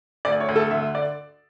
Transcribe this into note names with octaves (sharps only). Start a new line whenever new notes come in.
D2 D5
C#5
D2
A4
D3 E5
D5